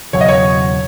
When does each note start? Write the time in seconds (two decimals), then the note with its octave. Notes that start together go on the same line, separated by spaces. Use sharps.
0.13 E1 E2 C#3 F#3 C#5
0.21 D#5
0.29 C#5